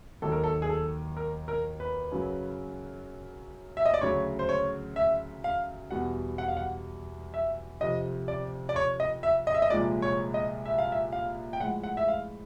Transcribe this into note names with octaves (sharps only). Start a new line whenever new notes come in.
D#2 D#3 F#3 A4
A#4
A4
G#4
A4
A#4
A#4
B4
F#2 C#3 F#3
E5
D#5
D5
D2 C#3 F#3 C#5
C5
C#5
E5
F5
E2 B2 G3 F#5
F#5
F5
F#5
E5
F2 C3 F3 D#5
D5
D5
C#5
D#5
E5
D#5
E5
D#5
C2 A#2 F3 G#3 D5
C#5
D#5
E5
F5
E5
F5
G5
A2 F3 G#3 F#5
F#5
E5
F5